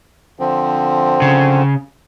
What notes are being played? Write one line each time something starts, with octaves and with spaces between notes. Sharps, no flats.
D3 F3 C4
C#3